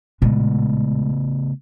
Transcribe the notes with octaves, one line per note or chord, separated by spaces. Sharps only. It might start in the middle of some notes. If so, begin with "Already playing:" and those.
A#2 C#3 G#3 A3 B3